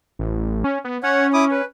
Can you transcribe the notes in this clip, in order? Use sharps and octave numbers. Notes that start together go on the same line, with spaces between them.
A1
C#4
B3
C#4 C#5 F#5
E4 D6 D#6
B4